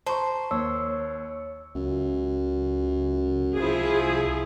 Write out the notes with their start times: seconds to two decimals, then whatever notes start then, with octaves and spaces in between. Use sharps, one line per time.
0.07 C5 A5 A#5 C#6
0.51 D#2 C#5 E6
1.75 C#2 F#2
3.57 C2 F3 E4 G#4